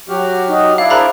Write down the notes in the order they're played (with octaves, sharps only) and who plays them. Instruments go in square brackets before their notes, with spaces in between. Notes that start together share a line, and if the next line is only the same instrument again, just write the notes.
[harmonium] F#3 [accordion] F#4 G4 F6
[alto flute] D#4
[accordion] D4 E4 D5 [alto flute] E5 [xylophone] F5
[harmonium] G#4 A#4 E5 [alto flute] C5 [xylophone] A#5 B5 F#6